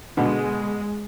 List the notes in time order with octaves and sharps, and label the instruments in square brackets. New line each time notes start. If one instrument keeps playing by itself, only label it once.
[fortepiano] B2 D3 [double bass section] G#3